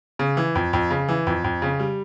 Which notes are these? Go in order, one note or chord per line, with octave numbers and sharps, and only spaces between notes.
C#3
E3
F2
F2
C#3
E3
F2
F2
C#3
G3